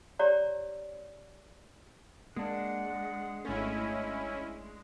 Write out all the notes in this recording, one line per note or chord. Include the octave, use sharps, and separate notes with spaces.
G4 C#5 D5 A#5
G#3 A#3 D4 F#5
G#1 A3 C#4 E4 D#5